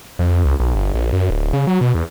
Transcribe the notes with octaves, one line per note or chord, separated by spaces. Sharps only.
F2
C#2
B1
G1
A#1
F#2
D1
C#3
F#3
B2
E2